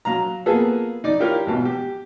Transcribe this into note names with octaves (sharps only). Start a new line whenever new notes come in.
F#3 F5 A#5
A#3 B3 F4 G#4 A4
D#4 D5
E4 F4 G4 A#4 C#5 F5
G#1 B2
G4